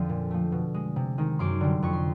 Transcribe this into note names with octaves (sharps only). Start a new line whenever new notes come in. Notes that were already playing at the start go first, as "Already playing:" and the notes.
Already playing: F2 D3 F3
A#2
F3 A3
B2
G#3
C3
D#3 G#3
F#2 C6 D6
D3 G3
F2 C#6
C6